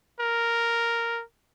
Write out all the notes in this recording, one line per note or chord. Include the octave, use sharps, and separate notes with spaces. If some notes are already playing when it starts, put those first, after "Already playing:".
A#4